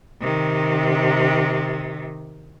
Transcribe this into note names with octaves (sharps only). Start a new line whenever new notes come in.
C3 D#3